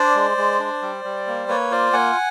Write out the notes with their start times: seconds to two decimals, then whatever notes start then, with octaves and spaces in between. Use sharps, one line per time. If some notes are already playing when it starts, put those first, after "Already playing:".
Already playing: D4 C5 D5
0.15 G#3
0.37 G#3
0.59 D4
0.82 G3
1.04 G3
1.27 A#3
1.48 A#3 B4 C#5
1.71 F4 C5 D5
1.93 A#3 F#5 G#5